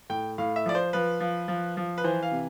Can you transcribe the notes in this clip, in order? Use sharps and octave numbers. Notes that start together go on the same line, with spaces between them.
A2 G5
A2 F5
E5
F3 D5
C5
F3 B4
F3
F3
F3
B4
E3 C5
F5
C3